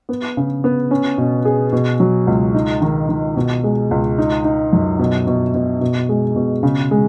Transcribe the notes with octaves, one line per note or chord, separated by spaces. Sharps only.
B3
C#3
B3
C#4
B2
G#4
B2
F#3
C#2
D#4
D#3
D#3
B2
G#3
C#2
D#4
D#4
F#2
B2
B2
B2
B2
G#3
B2
C#3
G#3